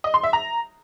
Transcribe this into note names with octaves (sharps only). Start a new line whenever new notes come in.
D#5
C6
E5
A#5